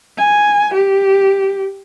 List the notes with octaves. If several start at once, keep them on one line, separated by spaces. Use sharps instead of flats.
G#5
G4